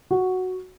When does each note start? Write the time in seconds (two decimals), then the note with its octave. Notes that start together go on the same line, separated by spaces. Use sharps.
0.11 F#4